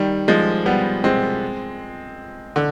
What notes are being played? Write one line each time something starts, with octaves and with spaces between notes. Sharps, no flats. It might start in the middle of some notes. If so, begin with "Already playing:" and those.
Already playing: D#3 G3
F3 G#3
G3 B3
G#3 C4
D3